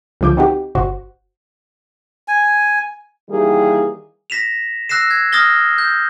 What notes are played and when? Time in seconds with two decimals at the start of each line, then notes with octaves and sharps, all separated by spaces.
0.21 C#2 D3 F3 D6 G6
0.37 C4 D#4 F#4 G4
0.75 G1 F#4 C5
2.28 G#5
3.29 D#3 E3 G3 A#3 G4 G#4
4.30 A#6 B6 E7 F7
4.89 E6 F#6 A#6 C7 E7
5.11 G#6
5.32 D#6 F6 A6 A#6 G7
5.78 G6